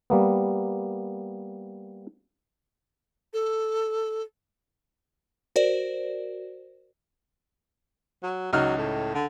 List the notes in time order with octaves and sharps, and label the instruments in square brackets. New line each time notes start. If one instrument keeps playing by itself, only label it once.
[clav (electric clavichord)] G3 A#3 B3
[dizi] A4
[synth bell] F#4 A#4 C5 D5
[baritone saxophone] F#3
[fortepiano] C#2 D#4 F6 [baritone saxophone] F#3
[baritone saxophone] A2
D3